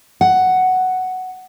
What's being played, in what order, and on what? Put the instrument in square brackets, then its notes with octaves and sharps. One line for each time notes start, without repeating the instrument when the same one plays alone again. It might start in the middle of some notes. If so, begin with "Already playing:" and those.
[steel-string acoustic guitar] F#5